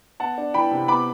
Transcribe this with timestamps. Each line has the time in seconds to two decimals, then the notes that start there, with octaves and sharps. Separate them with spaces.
0.20 B3 F#5 A5
0.38 D4
0.54 E3 G5 B5
0.71 C3
0.88 B3 B5 D6